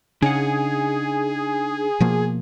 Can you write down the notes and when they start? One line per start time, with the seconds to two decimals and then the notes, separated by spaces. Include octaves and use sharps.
0.22 C#3 D4 D#4 G#4 F#5
2.00 B2 F3 A#3